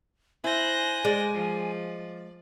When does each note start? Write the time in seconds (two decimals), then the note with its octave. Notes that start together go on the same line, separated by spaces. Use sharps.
0.44 E4 C5 G#5 F#6 A#6
1.05 G#3 D5
1.35 F3